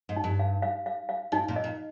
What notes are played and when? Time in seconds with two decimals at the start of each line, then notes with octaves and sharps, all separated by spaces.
0.09 G#2
0.16 D#4
0.24 G2
0.39 F5
0.62 F5
0.86 F5
1.09 F5
1.32 G#2 D#4
1.48 A#2
1.56 D#5
1.64 A#2